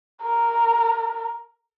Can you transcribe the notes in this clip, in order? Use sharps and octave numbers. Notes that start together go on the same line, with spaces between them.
A#4